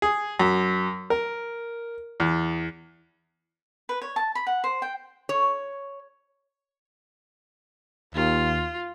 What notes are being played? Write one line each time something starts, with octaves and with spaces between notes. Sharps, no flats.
G#4
F#2
A#4
E2
B4
C#5
A5
B5
F#5
C5
G5
C#5
D#2 F4